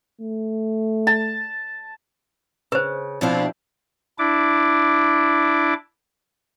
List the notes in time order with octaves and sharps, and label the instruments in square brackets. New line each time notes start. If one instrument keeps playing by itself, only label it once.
[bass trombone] A3
[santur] A5
[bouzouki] C#3 [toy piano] B4 C5
[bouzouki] B2 D4 F5 [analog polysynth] F3 C4 E4
[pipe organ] D4 E4 D6